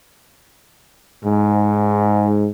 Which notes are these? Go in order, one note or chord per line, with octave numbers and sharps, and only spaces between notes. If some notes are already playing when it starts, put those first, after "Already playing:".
G#2